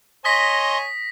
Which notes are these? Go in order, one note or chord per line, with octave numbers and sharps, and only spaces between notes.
C#5 D#5 G#5 C6 D#6 A#6 B6